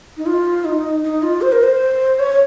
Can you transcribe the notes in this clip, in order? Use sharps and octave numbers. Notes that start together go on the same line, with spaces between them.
D#4
F4
D#4
D#4
F4
C5
A#4
C5
C#5